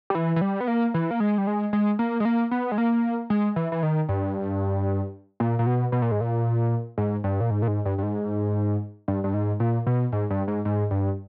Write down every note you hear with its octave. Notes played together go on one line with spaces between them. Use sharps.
G3
E3
E3
G3
B3
A#3
E3
A#3
G#3
G3
G#3
G#3
A#3
G#3
A#3
B3
G#3
A#3
G#3
E3
E3
D#3
G2
A#2
A#2
B2
B2
A#2
G#2
A#2
G#2
G2
A#2
G#2
A#2
G#2
G2
G2
G#2
G2
G2
G#2
A#2
B2
G#2
G2
G#2
G#2
G2